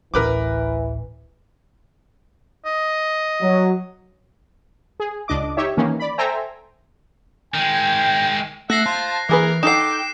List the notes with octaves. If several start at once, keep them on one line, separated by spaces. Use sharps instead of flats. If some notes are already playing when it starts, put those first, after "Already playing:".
A1 D2 E3 A#4 B4 D6
D#5
F#3
G#4
C#2 D4 D#5 D6
D#4 G4 C#5 E5
D#3 E3 A#3 C#4
D5 B5
A4 C5 E5 G5 G#5 A#5
D#3 G#3 G5
A3 E5 F#5 F#6 A#6 C7
F4 C5 A5
E3 A#3 G#4 A#4 B4
D#4 A4 F#5 G5 D6 C7 E7